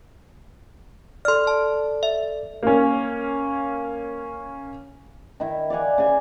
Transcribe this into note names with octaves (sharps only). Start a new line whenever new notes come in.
A4 D5 C6 F6
A5
E5
A#3 C#4
D#3 E4
D5 F5 F#5 G#5
C#3 G#5